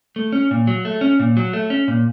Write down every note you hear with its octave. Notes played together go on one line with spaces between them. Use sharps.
A3
C#4
A#2
F#3
A3
C#4
A#2
F#3
A3
C#4
A#2